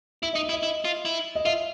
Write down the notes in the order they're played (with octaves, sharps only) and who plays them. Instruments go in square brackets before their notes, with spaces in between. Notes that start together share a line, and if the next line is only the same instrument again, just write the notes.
[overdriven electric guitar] E4 [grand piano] E5
[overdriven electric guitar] D#4 [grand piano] D#5
[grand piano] E5
[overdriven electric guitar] E4
[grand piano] D#5
[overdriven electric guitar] E4
F4
E4
[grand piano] D#5
[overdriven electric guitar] F4 [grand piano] E5